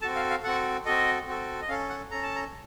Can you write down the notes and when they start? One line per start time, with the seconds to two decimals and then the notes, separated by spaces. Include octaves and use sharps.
0.02 C4 F#4 A4 A5
0.16 F5
0.30 F5
0.43 C4 F#4 A4 F#5
0.85 C4 F#4 A4 D#5
1.27 C4 F#4 A4
1.61 D#5
1.69 C#4 A4 F5
1.89 F#5
2.11 C#4 A4 A#5
2.23 A5
2.35 A#5